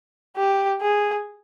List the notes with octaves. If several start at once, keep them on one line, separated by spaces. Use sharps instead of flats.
G4
G#4